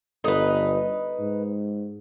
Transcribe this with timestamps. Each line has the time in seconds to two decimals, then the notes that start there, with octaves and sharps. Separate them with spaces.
0.24 G1 D#4 A4 B4 D#6
1.20 G#2